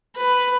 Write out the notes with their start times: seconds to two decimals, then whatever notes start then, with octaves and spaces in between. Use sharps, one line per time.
0.16 B4